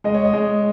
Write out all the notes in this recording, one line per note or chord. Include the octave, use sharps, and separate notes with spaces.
G#3 D#5
C#5
D#5
G#3